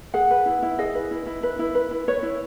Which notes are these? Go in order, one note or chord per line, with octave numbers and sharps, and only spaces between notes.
G#4 F#5
B4
E4
E4
G#4 D#5
B4
E4
E4
B4
E4
B4
E4
B4 C#5
E4